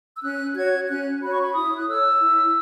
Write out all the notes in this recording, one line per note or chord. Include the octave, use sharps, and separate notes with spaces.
E6
C#4 F#6
F#4 C#5 G#6
C#4 F#6
F#4 C#5 B5
C#6
B5
E4 D#6
F#6
A4 C#5 E6
E4